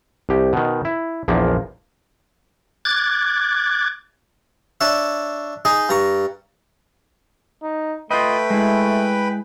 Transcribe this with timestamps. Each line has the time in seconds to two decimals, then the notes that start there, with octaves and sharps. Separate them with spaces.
0.29 C2 G4
0.53 B2 D#3
0.85 E4
1.28 A#1 E2 F3 A#3
2.85 D6 F#6 G#6 A6
4.81 D4 C#5 E5
5.65 D#4 G#4 D#5
5.89 G2 A#5 C#6
7.63 D#4
8.11 A3 F4 B4 D#5 G5 B5
8.50 G#3 E4